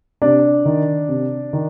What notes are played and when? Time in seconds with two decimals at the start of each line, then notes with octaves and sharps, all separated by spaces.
0.22 C3 D4 D5
0.65 D#3
1.09 C3
1.53 D#3